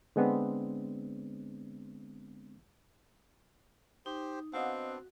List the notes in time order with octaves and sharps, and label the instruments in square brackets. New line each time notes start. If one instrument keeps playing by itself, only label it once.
[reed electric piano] D3 G#3 B3 C4 D4
[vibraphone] D#4 [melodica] G4 C5
[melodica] B3 D4 [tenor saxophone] C4 [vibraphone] F#4 [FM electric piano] D#5 F5 F#5